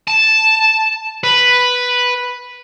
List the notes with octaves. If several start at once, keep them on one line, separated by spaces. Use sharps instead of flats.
A5
B4